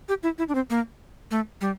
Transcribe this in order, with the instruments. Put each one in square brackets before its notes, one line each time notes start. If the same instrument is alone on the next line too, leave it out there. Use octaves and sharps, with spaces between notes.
[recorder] G4
E4
E4
D4
C4
A#3
A3
G3